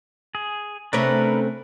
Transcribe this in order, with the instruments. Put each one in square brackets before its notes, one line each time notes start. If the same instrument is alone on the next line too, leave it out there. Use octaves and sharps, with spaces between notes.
[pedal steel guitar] G#4
[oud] C3 A3 C#4 [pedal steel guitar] D4 A#4 B4